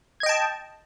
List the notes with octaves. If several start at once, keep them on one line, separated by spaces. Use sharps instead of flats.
D#5 G5 A5 G#6